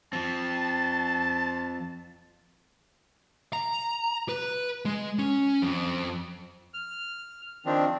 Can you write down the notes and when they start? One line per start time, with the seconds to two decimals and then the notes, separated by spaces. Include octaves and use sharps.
0.13 F3 C4 A5
3.53 A#5
4.29 B4
4.85 G#3
5.19 C#4
5.62 F2
6.74 F6
7.66 D#3 F3 C4 D4